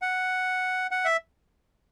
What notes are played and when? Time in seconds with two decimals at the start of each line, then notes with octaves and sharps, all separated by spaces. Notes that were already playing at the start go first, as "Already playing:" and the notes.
0.02 F#5
0.91 F#5
1.05 E5